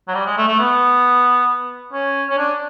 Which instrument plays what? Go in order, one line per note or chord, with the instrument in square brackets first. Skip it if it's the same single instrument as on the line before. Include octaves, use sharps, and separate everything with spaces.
[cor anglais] F#3
G3
G#3
A3
A3
B3
C#4
C#4
D4